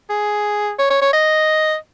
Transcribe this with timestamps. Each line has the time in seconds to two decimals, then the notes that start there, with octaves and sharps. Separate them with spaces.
0.10 G#4
0.79 C#5
0.90 C#5
1.01 C#5
1.13 D#5